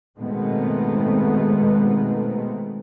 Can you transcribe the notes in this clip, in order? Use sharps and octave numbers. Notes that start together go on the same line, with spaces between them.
B2 D#3 G#3 A3 B3 C4